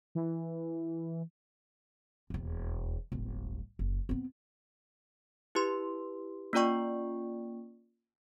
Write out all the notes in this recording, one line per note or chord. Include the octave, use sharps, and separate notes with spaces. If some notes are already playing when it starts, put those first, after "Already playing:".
E3
E1 D#2
D1 G1
F#1
B3 C4
E4 G4 B4 C6
A#3 C#4 F4 D5 G5 C#6